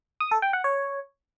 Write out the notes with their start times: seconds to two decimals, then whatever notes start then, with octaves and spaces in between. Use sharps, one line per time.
0.20 D#6
0.31 A4
0.42 G5
0.53 F#5
0.64 C#5